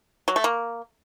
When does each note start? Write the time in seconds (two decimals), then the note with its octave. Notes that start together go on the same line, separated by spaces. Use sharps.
0.28 F#3
0.36 A3
0.44 A#3